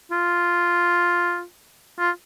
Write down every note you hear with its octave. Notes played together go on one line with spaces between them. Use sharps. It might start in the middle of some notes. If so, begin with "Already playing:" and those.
F4
F4